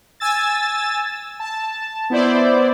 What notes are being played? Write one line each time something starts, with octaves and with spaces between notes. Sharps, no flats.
G#5 E6 A6
A5
B3 E4 C5 D5